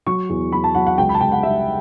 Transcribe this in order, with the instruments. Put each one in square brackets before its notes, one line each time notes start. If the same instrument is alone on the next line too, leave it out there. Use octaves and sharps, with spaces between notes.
[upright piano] F#3 C#6
E2
F#3 B5
A5
F#3 F#5
F#5
C#2 G5
B5
A5
C#2 G5
F#5
G3 E5